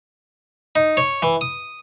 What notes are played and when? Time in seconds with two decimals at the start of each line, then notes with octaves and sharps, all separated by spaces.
0.76 D#4
0.97 C#5
1.22 E3
1.41 D#6